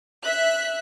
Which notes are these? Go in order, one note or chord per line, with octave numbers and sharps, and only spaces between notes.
E5 F#6